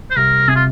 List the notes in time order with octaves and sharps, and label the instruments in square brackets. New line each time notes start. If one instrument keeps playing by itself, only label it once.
[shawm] C5
[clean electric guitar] C2 [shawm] A#4
[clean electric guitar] C3 [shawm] G#4
[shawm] F4